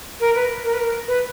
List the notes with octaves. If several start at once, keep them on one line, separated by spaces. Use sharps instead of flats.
A#4
B4
A#4
B4
A#4
B4